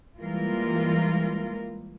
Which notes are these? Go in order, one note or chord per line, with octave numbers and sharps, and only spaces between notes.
E3 G3 G#3 A#3 F4 A#4